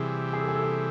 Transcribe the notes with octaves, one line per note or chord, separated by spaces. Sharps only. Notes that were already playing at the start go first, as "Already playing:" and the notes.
Already playing: C3 E3 G3 G#4
G#4
A4
G#4
A4
G#4